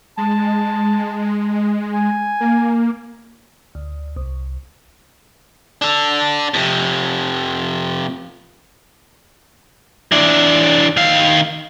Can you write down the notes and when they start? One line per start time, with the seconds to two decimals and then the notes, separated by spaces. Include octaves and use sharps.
0.17 G#3 A5
1.93 G#5
2.40 A#3
3.75 D2
4.16 C2
5.82 D4 A4
6.54 F2 C3
10.12 E3 D4
10.97 D#3 F5